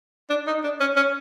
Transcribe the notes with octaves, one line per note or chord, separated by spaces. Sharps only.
D4
D#4
D4
C#4
C#4